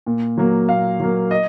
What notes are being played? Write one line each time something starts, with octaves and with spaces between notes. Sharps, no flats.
A#2
F#3 A#3
A#2 F5
F#3 A#3
D#5